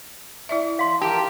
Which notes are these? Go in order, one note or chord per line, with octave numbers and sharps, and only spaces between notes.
E4 D5 E5
F5 C6
G4 A#4 G5 A5